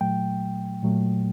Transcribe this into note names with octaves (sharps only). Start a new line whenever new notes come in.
A#2 F#3 A3 G5
A#2 F#3 A3